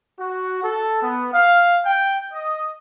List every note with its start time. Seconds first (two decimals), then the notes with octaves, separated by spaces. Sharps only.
0.19 F#4
0.63 A4
1.03 B3
1.34 F5
1.85 G5
2.33 D#5